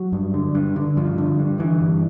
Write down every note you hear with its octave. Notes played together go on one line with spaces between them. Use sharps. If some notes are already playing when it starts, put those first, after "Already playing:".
Already playing: F#3
G2
D3
G2
D3
G2 F3
D3
G2
D3 E3
G2